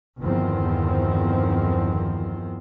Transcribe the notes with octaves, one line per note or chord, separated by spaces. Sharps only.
G1 E2 D#3 F3 C4